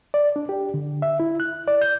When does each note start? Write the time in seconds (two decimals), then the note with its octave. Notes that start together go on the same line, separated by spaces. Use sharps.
0.14 D5
0.36 D4
0.49 G4
0.74 D3
1.02 E5
1.20 E4
1.40 F#6
1.68 D5
1.82 G6